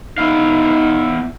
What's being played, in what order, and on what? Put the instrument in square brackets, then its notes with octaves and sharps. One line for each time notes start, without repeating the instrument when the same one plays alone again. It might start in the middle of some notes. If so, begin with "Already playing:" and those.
[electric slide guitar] B3 E4 F5 [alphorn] D#4